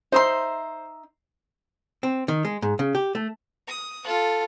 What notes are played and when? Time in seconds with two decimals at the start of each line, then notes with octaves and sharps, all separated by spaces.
0.12 D#4 C5 E5 C6
2.03 C4
2.28 D#3
2.45 G#3
2.62 G#2
2.79 C#3
2.95 G4
3.15 A3
3.68 D#6
4.05 F4 A4